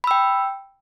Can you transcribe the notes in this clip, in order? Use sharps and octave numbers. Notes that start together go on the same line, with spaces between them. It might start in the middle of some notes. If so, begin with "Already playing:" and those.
G5 B5 E6